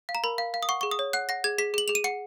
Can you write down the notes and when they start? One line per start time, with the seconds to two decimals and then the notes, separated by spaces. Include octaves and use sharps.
0.09 F5
0.15 A#5
0.24 A#4 B5
0.38 F5
0.54 F5
0.62 D#6
0.69 F#5 C#6
0.81 G#4 C#6
0.91 D#6
0.99 C#5
1.13 F#5 F#6
1.29 F#5 A#6
1.44 G#4 G#6
1.58 G#4 B6
1.74 G#4 F#7
1.88 G#4 F7
1.95 D#7
2.04 F#5 C#7